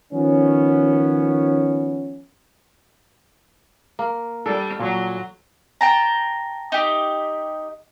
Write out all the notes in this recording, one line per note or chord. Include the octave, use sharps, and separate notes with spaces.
D#3 F3 B3 C#4
A#3
G3 D4 A4
A#2 F#3
G5 A5 A#5
D#4 G4